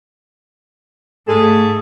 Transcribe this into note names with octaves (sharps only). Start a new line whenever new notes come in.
G#2 A3 G#4 A4